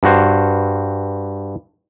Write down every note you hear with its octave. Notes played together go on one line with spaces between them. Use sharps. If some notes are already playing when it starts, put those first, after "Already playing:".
G2 F#4 C5